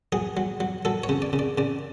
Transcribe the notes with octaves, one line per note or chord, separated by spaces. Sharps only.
F#3 G#4
F#3
F#3
F#3 A4
C#5
C#3
D5
C#3
D5
C#3 D5